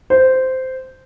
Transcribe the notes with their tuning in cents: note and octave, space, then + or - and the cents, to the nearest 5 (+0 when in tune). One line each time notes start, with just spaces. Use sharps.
C5 -10